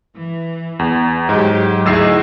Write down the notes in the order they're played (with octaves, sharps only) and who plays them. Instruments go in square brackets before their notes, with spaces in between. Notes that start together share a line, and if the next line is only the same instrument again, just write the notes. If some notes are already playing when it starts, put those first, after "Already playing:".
[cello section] E3
[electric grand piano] E2
[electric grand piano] G#2 [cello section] F#3 G4
[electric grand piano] D2 E6 C7 [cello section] D#4 E4 G#4